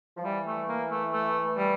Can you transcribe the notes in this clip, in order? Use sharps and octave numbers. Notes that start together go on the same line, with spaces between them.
F3
E3 G3
A3
A#3
A3
A3
G3